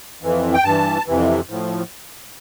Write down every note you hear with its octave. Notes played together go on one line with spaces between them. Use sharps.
F2 E3
G5
G2 E3 A5
F2 C3 E3
A2 F3